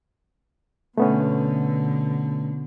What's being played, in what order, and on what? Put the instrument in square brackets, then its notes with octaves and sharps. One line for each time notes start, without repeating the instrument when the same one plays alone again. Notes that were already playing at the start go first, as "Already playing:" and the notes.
[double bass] B2 D3 [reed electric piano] A3 B3 C#4